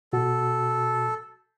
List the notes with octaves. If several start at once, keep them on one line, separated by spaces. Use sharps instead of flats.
B2 F#4 A4